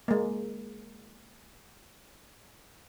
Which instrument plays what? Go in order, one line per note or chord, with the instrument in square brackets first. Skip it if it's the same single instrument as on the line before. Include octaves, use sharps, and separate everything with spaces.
[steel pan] G#3 A#3